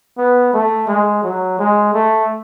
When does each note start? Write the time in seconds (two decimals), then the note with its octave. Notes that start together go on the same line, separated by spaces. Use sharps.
0.18 B3
0.53 A3
0.88 G#3
1.23 F#3
1.59 G#3
1.94 A3